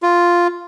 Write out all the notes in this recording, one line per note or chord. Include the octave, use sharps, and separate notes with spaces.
F4